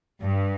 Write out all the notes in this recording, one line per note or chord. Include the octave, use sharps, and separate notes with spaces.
G2